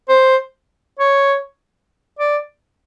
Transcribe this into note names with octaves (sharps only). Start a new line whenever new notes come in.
C5
C#5
D5